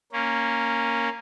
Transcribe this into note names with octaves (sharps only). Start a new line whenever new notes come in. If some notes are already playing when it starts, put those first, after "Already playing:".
A#3 C#4